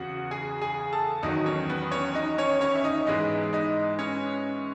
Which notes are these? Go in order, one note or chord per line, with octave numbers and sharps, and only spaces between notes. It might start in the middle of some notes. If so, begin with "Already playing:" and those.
Already playing: E2 C#3 F#4 F#5
G#4 G#5
G#4 G#5
A4 A5
E2 D#3 F#3 D#4 D#5
C#4 C#5
B3 B4
C#4 C#5
D#4 D#5
C#4 C#5
C#4 C#5
E5
D#4 D#5
G#2 E3 G#3 B3 D#4 D#5
D#4 D#5
C#4 C#5